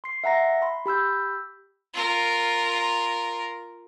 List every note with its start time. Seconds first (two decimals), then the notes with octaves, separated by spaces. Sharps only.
0.04 C6 C7
0.24 E5 F#5 A#5 A#6
0.62 B5 C6
0.86 G4 B5 E6 G6
1.94 F4 A#4